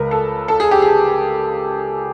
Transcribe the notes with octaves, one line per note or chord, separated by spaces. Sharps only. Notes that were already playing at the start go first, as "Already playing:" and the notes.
Already playing: C#2 C#3 G#3 A#4 B4
A4
A4
G#4
G4
G#4